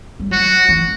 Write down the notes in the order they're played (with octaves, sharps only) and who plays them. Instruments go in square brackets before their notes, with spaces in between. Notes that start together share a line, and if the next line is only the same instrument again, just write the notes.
[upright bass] G3
[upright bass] F#3 [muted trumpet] F#4
[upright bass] E3